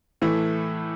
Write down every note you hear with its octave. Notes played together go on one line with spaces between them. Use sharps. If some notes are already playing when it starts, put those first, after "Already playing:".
A2 E3 A3 E4